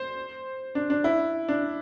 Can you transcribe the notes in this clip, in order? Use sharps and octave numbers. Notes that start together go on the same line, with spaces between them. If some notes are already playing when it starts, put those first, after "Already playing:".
Already playing: C5
D4
D4
E4
D4